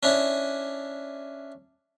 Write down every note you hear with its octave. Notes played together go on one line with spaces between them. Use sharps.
C#4 D4 E4